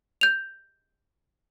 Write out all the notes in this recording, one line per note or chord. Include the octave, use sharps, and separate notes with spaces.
G6 F7